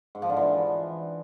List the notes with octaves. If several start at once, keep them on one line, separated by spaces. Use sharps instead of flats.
G#2
F3
D3
E3